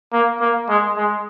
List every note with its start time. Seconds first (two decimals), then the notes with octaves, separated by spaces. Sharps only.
0.13 A#3
0.41 A#3
0.69 G#3
0.97 G#3